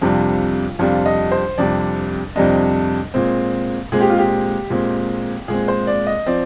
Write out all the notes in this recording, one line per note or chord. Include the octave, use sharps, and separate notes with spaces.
F2 C3 G3 D4 F4
F2 C3 G3 D4 F4
D#5
C5
F2 C3 G3 D4 D5
F2 C3 G3 D4 D#5
A#2 G#3 C4
A#2 G#3 C4 G#4
G4
F4
G4
A#2 G#3 C4
A#2 G#3 C4 G#4
C5
D5
D#5
F3 C4 D5